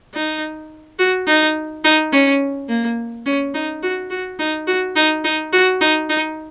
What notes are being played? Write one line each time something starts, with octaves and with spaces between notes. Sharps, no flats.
D#4
F#4
D#4
D#4
C#4
A#3
C#4
D#4
F#4
F#4
D#4
F#4
D#4
D#4
F#4
D#4
D#4